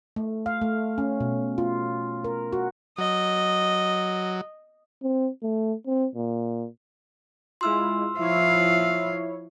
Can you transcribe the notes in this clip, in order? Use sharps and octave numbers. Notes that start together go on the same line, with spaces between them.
A3
F5
A3
C#4
B2
F4
A#4
F#4
F#3 D#5
C4
A3
C4
A#2
G#3 E4 F4 C6 E6 F6
F3 E4 C#5 E5 F5